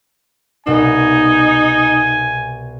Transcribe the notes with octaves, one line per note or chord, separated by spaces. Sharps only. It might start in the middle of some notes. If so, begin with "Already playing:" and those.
C2 B2 D#4 G#5 E7